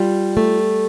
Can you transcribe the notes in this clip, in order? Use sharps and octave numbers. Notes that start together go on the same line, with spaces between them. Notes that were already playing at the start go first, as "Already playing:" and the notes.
Already playing: G3 F4
A3